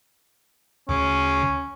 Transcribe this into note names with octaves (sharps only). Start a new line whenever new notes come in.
D2 C#3 C#4